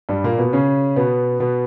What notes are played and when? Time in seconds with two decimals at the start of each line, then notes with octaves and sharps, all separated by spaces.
0.09 G2 G3
0.24 A#2 A#3
0.38 B2 B3
0.53 C#3 C#4
0.96 B2 B3
1.40 B2 B3